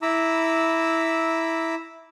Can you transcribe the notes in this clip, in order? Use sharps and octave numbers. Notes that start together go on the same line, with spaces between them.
E4 A#5 B5 D6 E6